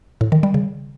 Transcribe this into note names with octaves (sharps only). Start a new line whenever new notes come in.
A2
D#3
G3
C#3